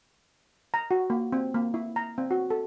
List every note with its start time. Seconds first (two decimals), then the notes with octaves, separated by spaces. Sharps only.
0.74 A#5
0.91 F#4
1.10 A#3
1.33 C4
1.54 A#3
1.74 E4
1.96 A#5
2.18 C4
2.31 F#4
2.50 A4